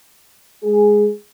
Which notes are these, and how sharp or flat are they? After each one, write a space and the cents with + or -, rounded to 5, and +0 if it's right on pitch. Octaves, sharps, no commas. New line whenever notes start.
G#3 +0 G#4 +0